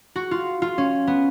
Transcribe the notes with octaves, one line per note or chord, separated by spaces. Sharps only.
F#4
F4
F4
C#4
B3